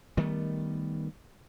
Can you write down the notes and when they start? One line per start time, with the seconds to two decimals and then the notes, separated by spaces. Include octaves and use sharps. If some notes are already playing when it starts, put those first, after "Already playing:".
0.17 D#3 G3 A3 B3